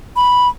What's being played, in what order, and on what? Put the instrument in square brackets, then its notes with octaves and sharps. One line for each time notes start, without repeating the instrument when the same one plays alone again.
[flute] B5